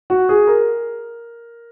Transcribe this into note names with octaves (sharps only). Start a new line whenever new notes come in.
F#4
G#4
A#4